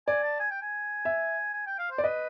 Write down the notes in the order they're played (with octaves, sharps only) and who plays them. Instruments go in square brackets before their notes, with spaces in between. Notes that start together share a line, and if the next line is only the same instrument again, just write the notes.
[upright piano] D5 [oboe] G#5
[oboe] A5
G#5
G5
G#5
[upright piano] E5
[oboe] G#5
G5
F5
C5
[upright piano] D5
[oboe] B4 [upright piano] D#5